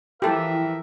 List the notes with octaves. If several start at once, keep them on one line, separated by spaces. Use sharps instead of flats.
E3 F3 E4 G4 A4 A#4 E5 G5